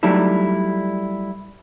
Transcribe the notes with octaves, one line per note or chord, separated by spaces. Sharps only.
F#3 G3 A3 D#4 E4 A4